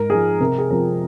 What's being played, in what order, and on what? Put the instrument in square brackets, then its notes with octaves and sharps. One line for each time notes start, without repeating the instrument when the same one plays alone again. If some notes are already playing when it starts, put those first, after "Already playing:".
Already playing: [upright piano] G#2 A#4
F3 G#3 D#4 G#4
C3 A#4
G#4
F3 C4 F4 A#4